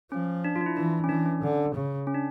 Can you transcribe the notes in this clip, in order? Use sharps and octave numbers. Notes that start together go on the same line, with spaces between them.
F3 C#4
D4
F4
D4
E4
E3 D4
C#4
E3 D4
C#4
D3
C#3
C#4
D4